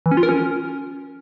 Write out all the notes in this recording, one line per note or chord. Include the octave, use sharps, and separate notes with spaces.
E3
C#4
F4
A#4
C#4